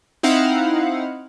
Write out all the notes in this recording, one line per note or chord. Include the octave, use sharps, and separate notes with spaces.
C4 D#4 E4 F5 F#5